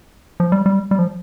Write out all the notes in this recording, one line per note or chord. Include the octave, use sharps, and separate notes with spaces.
F3
G3
G3
G3
F3